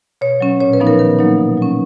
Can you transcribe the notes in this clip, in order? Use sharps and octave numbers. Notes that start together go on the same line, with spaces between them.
B2 C#5
F#3 C#4
A#2 C#5
B4
F3 B3 D#4
A#4
D#3 A#4
F#3 A#3 D#4
B2
F#3 C#4